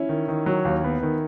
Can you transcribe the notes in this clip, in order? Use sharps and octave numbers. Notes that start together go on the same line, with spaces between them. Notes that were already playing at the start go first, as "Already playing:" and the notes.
Already playing: C#4 E4
D#3
D#3
F#3
D#2
B3
D#3